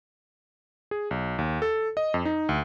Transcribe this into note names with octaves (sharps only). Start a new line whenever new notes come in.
G#4
B1
D#2
A4
D#5
F2
D#4
D2